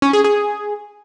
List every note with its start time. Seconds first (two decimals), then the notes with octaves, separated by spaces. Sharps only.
0.02 C#4
0.13 G#4
0.24 G#4